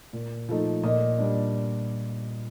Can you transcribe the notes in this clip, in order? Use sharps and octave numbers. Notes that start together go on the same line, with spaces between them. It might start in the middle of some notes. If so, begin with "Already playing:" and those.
A#2
F3 A3 D#4
A#2 D#5
G3 D4